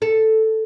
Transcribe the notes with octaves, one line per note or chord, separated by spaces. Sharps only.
A4